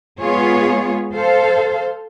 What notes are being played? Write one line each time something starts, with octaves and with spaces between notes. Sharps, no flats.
G#3 B3 F4 G#4 C#5
A4 C5 F5